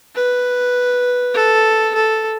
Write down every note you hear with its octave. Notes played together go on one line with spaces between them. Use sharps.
B4
A4
A4